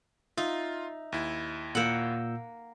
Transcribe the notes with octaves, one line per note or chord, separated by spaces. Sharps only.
D#4 F4 E5
D#2 E4
A#2 A#3 F#5 E6 G6